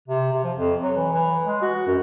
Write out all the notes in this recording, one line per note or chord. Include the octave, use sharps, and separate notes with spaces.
C3
C3
F3
F2
F#3
E3
E3
G#3
F#4
F#2